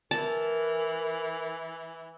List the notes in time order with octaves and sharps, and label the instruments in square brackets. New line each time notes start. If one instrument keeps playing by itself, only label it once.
[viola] E3 [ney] A#4 [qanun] A5